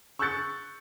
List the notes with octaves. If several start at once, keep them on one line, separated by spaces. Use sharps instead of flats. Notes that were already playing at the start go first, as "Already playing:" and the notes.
C#6 E6 F#6 G6 A6 C#7